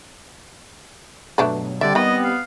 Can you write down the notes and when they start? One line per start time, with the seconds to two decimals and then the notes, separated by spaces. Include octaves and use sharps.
1.38 G2 B2 F#3 A3 D4 B4
1.81 D3 G3 C4 G4 D5 E5
1.95 D#3 B3 D#5 B5
2.24 F5